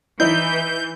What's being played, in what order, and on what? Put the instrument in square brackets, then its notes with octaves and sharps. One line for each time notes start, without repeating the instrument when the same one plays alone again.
[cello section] E3 [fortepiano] D#4 E4 [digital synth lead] G6